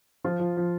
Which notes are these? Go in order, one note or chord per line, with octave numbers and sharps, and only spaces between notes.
F3 F4
F3
F3